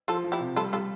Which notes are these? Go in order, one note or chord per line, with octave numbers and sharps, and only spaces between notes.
F3 F4 A4
F3
E4 G4
C3
G3 F4 A4
G3 F4 A4